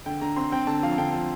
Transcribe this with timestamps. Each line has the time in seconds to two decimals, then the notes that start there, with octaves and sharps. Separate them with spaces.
0.06 D3 G5
0.21 D3 A#5
0.36 C4 C6
0.52 C4 G5
0.67 D3 A5
0.83 F3 F5
0.92 A5
0.98 D3 G5
1.14 F3